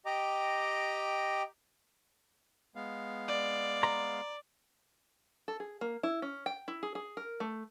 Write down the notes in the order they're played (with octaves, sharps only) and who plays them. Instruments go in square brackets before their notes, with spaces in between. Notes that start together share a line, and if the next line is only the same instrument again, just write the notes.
[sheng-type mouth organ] G4 D#5 G5 A#5 D6
[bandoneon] G#3 B3 F5
[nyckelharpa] D5
[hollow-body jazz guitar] A#5 C6
[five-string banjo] A4
G#4
A#3
E4
C#4
G5
E4
G#4
G#4
A#4
A3